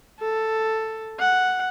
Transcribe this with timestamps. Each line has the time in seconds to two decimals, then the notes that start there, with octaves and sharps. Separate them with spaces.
0.20 A4
1.19 F#5